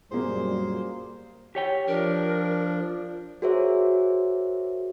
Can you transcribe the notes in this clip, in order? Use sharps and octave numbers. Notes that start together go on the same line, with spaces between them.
F#2 A#2 G3 A#3 G#4 C5
G4 C#5 G5
F3 D4 A#4
F#4 G#4 A#4 C5 C#5 E5